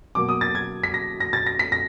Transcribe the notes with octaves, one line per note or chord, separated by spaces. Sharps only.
B2 F#3 A#3 D6
D#6
A6
G#6
B6
A#6
A#6
A6
A#6
B6
A#6